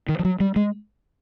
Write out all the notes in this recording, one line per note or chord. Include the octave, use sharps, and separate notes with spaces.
D#3
F3
F#3
G3
G#3